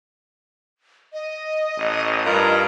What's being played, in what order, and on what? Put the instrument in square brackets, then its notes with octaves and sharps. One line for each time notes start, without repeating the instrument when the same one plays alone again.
[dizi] D#5
[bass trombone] A1
[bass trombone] G2 [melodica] F4 A#4 A#5